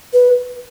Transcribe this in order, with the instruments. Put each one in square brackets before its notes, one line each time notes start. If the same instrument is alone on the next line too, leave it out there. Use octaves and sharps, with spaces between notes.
[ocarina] B4